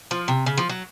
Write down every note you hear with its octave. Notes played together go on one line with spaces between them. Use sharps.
F3
C3
C#3
F3
F#3